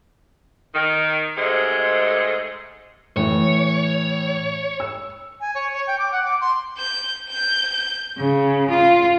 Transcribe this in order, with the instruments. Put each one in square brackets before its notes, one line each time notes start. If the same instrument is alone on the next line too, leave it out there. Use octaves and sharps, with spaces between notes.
[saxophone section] D#3
G#2 C3 G#3 A3 D#5
[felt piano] A2 E3 [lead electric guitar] C#5
[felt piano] E6
[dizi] G#5
C#5
C#5
G5
D6
F#5
D6
C6
[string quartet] G6
G6
C#3
F4